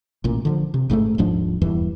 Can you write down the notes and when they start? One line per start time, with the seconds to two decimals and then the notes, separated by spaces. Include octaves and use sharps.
0.24 A1 A#2
0.45 D3 E3 F3
0.74 C3
0.90 A1 G#2 E3 A3
1.18 D#1 G#2 F3 D4
1.61 D#1 E2 G2 E3